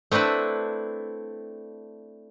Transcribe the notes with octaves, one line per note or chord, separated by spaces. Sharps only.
A3 C4 D4 E4 B4